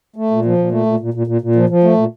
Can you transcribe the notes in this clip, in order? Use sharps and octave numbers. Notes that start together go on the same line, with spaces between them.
A3
A#2
F3
A#2
A3
A#2
A#2
A#2
A#2
A#2
F3
F3
A3
A#2